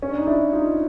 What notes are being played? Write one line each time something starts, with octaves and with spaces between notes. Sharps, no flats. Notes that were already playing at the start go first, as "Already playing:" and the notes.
C#4
D4
D#4
D4 E4
D#4 F4